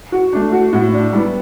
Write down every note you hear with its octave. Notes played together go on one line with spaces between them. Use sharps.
F#4
A3 D4
F#4
A2 F#4
D4
G3 B3 E4